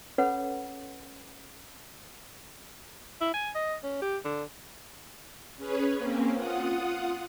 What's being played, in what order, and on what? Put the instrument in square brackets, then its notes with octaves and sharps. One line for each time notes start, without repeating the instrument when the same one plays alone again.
[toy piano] C#4 A4 B4 C#5 F#5 B5
[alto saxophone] E4
G#5
D#5
C#4
G4
D3
[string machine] C#4 G#4 B4 C#5
A#3 C4 C#4
F4 F#5 D#6